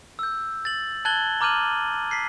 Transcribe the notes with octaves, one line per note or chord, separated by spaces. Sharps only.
E6 G6
A6 F#7
A5 F#6 G#6 A6 F#7 G7
A#5 D6 F6 G6 D#7 F#7
B6 C7